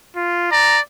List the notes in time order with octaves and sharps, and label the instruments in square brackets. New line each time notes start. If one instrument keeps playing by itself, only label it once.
[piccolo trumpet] F4
[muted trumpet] D5 [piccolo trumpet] A#5